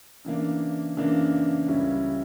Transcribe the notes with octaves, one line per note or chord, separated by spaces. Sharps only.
C#3 E3 A#3 D4
C#3 E3 A#3 D4
C#2 C#3 G3 C#4 E4